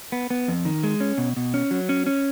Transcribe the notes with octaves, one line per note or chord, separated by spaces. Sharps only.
B3
B3
F2
D#3
G#3
C#4
B2
B2
C#4
F#3
C#4
C#4